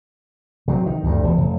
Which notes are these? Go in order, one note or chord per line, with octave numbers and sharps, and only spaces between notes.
C3 F#3
D#3
D2 G2
E1
F1